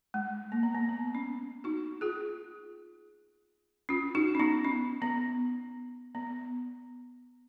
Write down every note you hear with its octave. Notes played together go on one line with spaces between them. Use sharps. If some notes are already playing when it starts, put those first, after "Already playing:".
G#3
A#3
B3
A#3
B3
C#4
D#4 F#4
F4 G#4
C#4 F4
D#4 F#4
C#4
B3 D#4
C#4
B3
B3